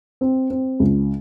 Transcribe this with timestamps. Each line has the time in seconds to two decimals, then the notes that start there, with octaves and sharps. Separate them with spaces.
0.21 C4
0.50 C4
0.80 C#2